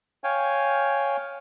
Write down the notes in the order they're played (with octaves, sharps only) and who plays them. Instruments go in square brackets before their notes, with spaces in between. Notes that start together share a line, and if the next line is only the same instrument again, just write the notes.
[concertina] C#5 F5 G5 G#5